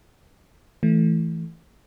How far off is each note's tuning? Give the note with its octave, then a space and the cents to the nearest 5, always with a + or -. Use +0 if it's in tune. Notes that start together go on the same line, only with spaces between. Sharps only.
E3 +0 A3 +0